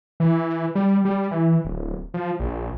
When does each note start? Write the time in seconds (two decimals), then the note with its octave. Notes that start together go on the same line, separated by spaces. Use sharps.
0.20 E3
0.75 G3
1.05 G3
1.31 E3
1.65 D1
2.14 F3
2.40 A#1